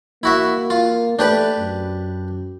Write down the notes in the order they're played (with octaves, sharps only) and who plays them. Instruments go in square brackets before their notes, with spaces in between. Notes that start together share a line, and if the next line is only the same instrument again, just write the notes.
[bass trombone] A#3 [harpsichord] E4 F#4 E5
[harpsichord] F4
[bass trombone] A3 [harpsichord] D4 G4 B4
[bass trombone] F#2